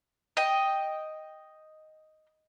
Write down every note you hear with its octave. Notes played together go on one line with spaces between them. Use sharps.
D#5 G5